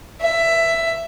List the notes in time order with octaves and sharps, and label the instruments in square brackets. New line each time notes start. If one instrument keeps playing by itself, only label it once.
[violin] E5